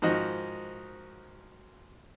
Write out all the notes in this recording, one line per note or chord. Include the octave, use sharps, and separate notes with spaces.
G#2 D#3 F3 F#4 D#5